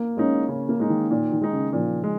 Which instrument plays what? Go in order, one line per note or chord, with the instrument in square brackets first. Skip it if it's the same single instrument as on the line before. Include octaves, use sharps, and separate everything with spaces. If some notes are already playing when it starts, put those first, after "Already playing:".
Already playing: [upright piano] A#3
[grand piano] G#3 D#4 [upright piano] C#4
[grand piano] C#3 [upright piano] C#4
[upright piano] A#3
[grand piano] G#3 D#4
[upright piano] D#3
[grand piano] A#2 [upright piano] D#3
[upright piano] D#3
[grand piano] G#3 D#4
[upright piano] C#3
[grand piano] A#2 [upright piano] F3
[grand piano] G#3